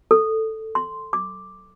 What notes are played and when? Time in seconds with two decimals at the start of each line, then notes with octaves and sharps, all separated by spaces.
0.11 A4
0.75 C6
1.13 D6